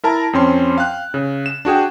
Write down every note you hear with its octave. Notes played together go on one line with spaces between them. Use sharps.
E4 A#4 A5 A#5
F2 C4 C#4 C6
F5 G5 F#6
C#3
E7
D4 F#4 G#4 G5